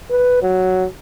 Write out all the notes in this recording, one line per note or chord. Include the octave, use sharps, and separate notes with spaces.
B4
F#3